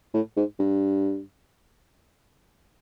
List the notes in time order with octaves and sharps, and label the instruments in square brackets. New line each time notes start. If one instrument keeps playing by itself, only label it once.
[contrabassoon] A2
G#2
G2